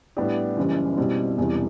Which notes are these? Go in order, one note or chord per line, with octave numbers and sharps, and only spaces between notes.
A2 G3 B3 D4 G4
F#1 F#2 E3 G3
B2 G3 C4 E4
E1 E2 C3 E3 G3